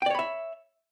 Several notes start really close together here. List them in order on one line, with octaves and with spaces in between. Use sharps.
G5 D5 C#5 B5 E5